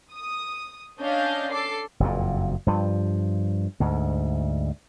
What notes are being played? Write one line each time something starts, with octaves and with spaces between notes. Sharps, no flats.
D#6
C#4 D4 D#5 F5 G6
A4 D6 C7
F#1 F2 A#2
G2 F3
D2 G#2